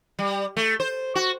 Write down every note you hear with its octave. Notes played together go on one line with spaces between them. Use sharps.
G3
A3
C5
F#4